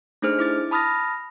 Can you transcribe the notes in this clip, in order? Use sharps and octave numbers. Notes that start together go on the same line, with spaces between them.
A3 D4 D#4 G#4 C5 F6
E4 D6 A6
A5 B5 D#6 F6 A6 A#6